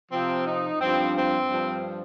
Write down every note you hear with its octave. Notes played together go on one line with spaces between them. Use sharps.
C3 F3 C4
D#4
G2 F3 C4
C4
G2 F3